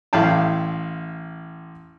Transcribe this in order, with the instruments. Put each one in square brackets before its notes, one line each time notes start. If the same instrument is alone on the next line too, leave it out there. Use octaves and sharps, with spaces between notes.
[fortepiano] A1 E4 F5 G5 A5